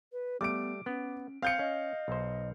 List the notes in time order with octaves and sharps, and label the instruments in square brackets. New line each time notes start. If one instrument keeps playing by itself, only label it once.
[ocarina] B4
[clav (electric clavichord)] G3 A3 [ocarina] B3 [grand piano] D6 D7
[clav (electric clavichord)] B3 [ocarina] C#4
[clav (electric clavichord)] C4 [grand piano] F5 G6 C#7
[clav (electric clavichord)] C#4 [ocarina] D#5
[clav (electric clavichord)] B1 C5